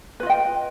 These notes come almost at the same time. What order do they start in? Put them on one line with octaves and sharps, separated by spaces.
B4 F4 D#5 G5